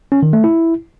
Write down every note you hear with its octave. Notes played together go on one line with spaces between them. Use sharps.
C#4
D#3
A3
E4